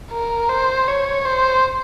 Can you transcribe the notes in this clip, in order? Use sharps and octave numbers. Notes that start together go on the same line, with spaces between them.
A#4
C5
C#5
C5